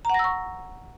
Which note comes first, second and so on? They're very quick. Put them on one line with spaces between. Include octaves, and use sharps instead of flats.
A#5 F#5 A#6 E6 C#6